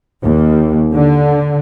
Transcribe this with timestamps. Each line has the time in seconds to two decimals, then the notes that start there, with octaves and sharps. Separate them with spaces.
0.23 D#2
0.94 D3